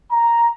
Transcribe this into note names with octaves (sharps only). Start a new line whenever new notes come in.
A#5